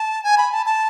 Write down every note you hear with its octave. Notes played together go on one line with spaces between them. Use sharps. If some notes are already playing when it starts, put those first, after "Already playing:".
Already playing: A5
G#5
B5
A5
A5